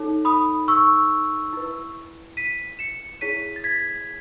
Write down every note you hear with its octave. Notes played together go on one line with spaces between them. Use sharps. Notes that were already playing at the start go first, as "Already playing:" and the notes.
Already playing: D#4 A4 C#5
B5 D#6
C#6 E6
E4 B4
B6 D#7
C#7 E7
E4 G#4 C#5 B6 D#7
A6
G#6 B6